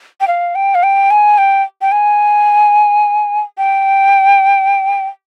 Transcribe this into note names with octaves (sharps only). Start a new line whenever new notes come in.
G5
F5
G5
F5
G5
G#5
G5
G5
G#5
G5